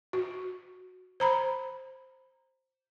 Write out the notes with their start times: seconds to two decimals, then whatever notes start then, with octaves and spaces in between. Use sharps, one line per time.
0.13 F#4
1.20 C5 A#5 B5